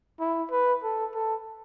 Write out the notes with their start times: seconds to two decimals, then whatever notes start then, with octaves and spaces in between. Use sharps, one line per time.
0.20 E4
0.51 B4
0.83 A4
1.14 A4